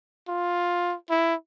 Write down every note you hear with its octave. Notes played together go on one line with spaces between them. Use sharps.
F4
E4